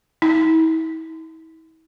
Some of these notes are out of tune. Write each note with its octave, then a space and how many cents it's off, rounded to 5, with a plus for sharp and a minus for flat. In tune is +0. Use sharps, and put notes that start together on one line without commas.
E4 -40